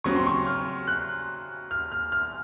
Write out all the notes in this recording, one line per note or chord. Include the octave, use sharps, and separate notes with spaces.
C#3 F#3 C4 C#6
C6
C#6
F6
F#6
F6
F6
F6